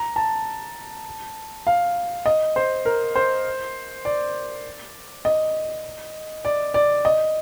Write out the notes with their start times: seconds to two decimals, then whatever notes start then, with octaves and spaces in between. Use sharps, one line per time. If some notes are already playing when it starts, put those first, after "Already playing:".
Already playing: A#5
0.16 A5
1.67 F5
2.26 D#5
2.56 C5
2.85 A#4
3.15 C5
4.05 D5
5.25 D#5
6.45 D5
6.74 D5
7.05 D#5